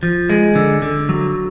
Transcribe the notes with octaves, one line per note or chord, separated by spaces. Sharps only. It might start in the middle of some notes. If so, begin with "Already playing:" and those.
F3
G#3
D3
D3
F#3